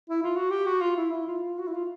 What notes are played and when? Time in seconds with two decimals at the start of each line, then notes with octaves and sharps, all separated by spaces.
0.09 E4
0.23 F4
0.36 F#4
0.51 G4
0.66 F#4
0.81 F4
0.96 E4
1.12 E4
1.27 F4
1.42 F4
1.59 F#4
1.67 E4
1.74 F4